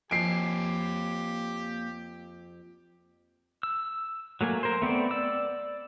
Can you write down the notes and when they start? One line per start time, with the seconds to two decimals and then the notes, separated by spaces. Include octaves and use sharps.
0.11 F2 A#3 G4 C#5 G#5 G6 C7 D7
3.63 E6
4.41 F#3 A3 A#3 G#5
4.63 A#4 C5
4.82 A3 B3 C4 D5
5.11 D5 E6